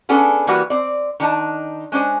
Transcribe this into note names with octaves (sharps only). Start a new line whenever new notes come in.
B3 C#4 D4 G#4 A4
E3 G3 A#3 F#4 B4
C4 D5
D#3 D4 D#4 A5
G#3 C#4 D4 C5 G#5